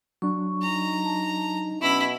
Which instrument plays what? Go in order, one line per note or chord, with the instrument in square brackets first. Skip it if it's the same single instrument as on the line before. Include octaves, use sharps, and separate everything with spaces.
[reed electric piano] F#3 D4 [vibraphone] C#6
[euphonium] D#4 [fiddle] A#5
[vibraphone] A5
[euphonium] B2 [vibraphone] C#4 E6 [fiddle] E4 B5